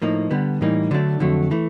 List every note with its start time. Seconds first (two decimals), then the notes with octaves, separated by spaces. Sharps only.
0.02 A2 F3 A#3 D#4
0.31 D3 G3 B3
0.61 A2 E3 G3 A#3 D#4
0.91 D3 F#3 A3 D4
1.20 F2 D3 F#3 A3
1.51 E3 A3